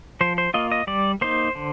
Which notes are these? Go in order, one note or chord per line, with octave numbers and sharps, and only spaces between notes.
F3 C5
C5
A#3 F4 D#5
D#5
G3 D5
A#3 D#4 C5
D3